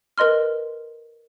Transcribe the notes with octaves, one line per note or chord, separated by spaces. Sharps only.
A#4 B4 D#5 C6 F6